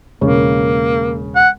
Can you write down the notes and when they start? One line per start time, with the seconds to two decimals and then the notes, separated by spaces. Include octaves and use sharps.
0.21 E1 C#3 A#3 C#5
1.36 F#5